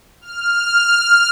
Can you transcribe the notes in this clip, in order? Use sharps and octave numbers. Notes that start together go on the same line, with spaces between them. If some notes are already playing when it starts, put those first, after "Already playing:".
F6